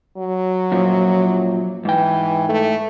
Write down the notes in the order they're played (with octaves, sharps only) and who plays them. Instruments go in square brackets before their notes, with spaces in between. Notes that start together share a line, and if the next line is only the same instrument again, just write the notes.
[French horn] F#3
[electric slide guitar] F#2 A#2 F3
[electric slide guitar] G#2 G5 [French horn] E3
[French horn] A3